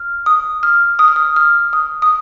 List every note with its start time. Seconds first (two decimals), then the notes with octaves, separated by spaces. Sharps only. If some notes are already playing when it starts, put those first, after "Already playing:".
Already playing: F6
0.26 D#6
0.63 F6
0.99 D#6
1.08 F6
1.16 D#6
1.36 F6
1.73 D#6
2.02 D#6